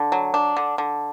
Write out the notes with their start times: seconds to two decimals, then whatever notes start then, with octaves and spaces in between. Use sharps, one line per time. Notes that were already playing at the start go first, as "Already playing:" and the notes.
Already playing: D3
0.12 F#3
0.34 D4
0.57 D3
0.78 D3